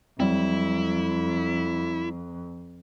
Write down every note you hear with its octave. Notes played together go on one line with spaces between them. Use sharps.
F2 F#3 G3 C4 E4